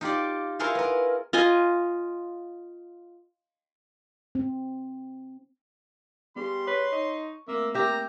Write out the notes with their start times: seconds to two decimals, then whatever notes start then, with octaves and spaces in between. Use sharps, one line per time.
0.01 D#4 F4 G4 D5
0.59 E4 F4 G#4 A#4 C5 C#5
0.75 B3 A#4
1.33 F4 D#5 G#5
4.35 C4
6.36 G3 B3 G4 G#4 C6
6.67 B4 C#5 C#6
6.92 D#4 C#6
7.48 A3 A#3 C4 E5
7.74 A#3 G4 E5 A#5